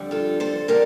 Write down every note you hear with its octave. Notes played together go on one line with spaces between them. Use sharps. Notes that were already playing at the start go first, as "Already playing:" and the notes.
Already playing: F2 D3 G3
F4 A4
A4 C5
D3 G3 A#4 D5